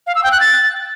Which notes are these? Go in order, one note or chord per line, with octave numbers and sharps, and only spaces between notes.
F5
E6
G5
F#6
A6